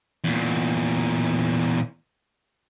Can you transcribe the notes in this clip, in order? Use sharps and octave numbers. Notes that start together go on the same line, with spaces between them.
E2 A#2